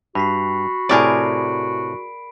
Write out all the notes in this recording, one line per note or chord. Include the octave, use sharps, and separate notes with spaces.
G2 F#4 B5 B6 C7
A2 C3 G#4 A#4 D5 D7